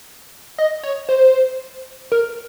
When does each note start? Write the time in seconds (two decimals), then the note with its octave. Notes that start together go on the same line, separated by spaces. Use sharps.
0.58 D#5
0.83 C#5
1.09 C5
2.12 A#4